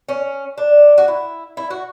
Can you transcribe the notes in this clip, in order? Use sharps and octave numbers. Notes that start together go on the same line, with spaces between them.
C#4
D4
F#4
E4
E4
F#4